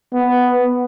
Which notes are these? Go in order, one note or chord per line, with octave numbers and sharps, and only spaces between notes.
B3